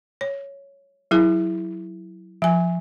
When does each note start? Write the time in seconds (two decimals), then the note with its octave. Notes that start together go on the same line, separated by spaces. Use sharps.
0.21 C#5
1.11 F#3 E4 G#4
2.42 F3 G#5